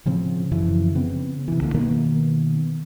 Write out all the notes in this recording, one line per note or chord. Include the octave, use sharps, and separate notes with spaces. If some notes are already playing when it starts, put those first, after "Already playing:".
A2 C#3 F3 C4
F#2 C#3 E3 F3
C#3 B3 C4
C3 E3
C#2 D3 A#3
B2 D#3 A#3 B3